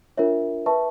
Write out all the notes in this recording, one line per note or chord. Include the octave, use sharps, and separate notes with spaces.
D4 F4 A#4 C#5 E5
B4 E5 A5 C#6